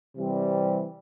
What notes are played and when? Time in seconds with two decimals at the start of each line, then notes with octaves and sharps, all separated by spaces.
0.16 C3 E3 G3 C4